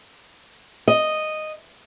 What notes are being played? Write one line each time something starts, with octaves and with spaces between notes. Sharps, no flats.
D#5